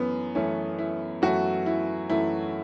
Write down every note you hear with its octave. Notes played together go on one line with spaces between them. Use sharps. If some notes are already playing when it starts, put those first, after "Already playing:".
Already playing: F#2 E3 A3 B3 C#4
F#2 E3 A3 C#4
E4
F#2 E3 A3 F#4
E4
F#2 E3 A3 E4